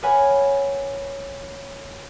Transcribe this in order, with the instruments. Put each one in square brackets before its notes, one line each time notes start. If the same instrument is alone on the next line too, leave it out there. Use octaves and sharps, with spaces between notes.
[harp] A#4 B4 C#5 F#5 G#5 B5